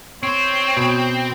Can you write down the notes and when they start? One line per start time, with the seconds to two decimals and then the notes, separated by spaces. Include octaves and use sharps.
0.23 C4 C#5
0.77 B2